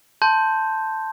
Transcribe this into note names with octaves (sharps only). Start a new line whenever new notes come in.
A5 C6 G6